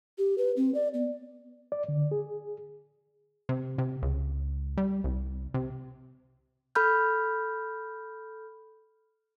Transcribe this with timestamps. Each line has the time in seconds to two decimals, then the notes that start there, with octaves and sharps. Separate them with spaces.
0.18 G4
0.38 B4
0.56 C4
0.74 D5
0.94 B3
1.72 D5
1.88 D3
2.11 G#4
3.49 C3
3.78 C3
4.03 C#2
4.77 G3
5.04 C2
5.54 C3
6.75 A4 B5 F6 G6